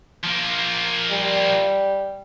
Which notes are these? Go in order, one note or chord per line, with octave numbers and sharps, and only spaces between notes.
F3 A#3
G3